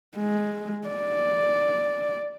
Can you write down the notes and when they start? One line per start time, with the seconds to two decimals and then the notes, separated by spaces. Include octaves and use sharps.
0.16 G#3
0.88 D5